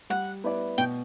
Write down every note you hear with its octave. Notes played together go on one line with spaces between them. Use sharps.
G3 F#5
B3 E4 B4 D5
B2 G5